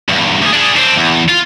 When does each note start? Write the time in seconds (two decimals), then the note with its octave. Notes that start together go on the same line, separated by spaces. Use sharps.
0.09 E2 G2
0.42 D2 G#4
0.53 D4 G#4
0.77 C4 D4
0.96 E2
1.29 F4